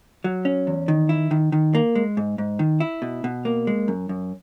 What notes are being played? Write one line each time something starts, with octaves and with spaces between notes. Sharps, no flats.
F#3
C#4
E2
D#3
E4
D#3
D#3
A#3
G#3
G#2
G#2
D#3
E4
B2
B2
A#3
G#3
F#2
F#2